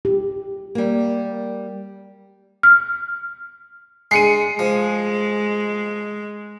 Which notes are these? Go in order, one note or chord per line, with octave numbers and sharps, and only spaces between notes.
G4
G3 A#3
F6
G#3 C7 C#7 D#7
F3 G#3